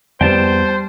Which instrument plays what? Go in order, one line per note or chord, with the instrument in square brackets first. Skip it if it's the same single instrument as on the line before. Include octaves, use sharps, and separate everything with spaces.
[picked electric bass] F2 B3 [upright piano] G3 [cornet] C5 [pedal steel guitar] G5 A5